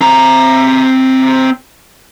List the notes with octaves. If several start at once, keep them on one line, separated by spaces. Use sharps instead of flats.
C4 A#5